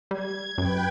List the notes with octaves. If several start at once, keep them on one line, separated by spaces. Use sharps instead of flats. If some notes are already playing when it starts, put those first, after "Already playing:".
G3 G#6
F#2 B4 G5